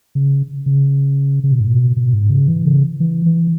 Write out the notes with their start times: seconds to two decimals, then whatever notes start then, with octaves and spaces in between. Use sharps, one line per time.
0.15 C#3
0.66 C#3
1.44 C#3
1.52 B2
1.60 G#2
1.67 B2
1.97 B2
2.13 G#2
2.30 C#3
2.48 E3
2.66 C#3
3.00 E3
3.26 E3